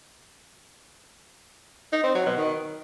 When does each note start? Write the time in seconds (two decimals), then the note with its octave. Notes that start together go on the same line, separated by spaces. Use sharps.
1.93 D#4
2.04 C4
2.15 F#3
2.26 B2
2.37 D#3